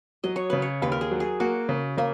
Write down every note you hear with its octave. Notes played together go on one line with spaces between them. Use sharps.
F#3 D#5
C#5
C#3 B4
C#5
D#2 B4
A#4
G#4
F#3
G#4
A#3 F#4
C#3
C#3 A#3